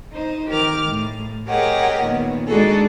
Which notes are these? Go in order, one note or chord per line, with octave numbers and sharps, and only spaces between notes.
D#4 C5
D#3 G4 A#4 D6 F6
A2
G4 G#4 A#4 C#5 D#5 F#5
A#2 D#3 B3
G#3 D4 D#4 F#4 G#4 A4